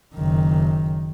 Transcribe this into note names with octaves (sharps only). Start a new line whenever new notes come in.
F#1 D#3